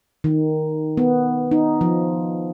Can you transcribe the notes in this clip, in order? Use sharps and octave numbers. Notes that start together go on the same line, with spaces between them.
D#3
B3
D#4
F3